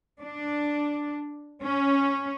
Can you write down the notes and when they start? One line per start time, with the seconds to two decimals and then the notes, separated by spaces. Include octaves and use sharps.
0.19 D4
1.62 C#4